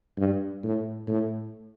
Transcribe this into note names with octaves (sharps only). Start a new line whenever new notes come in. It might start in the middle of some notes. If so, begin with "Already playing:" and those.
G2
A2
A2